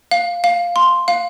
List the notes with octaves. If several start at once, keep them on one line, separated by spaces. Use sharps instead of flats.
F5
F5
C6
F5